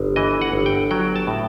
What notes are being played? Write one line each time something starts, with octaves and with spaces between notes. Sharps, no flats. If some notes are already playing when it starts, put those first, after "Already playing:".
Already playing: G1
E3 D#5
F#5
G1
G5
F#3 G5
A5
A2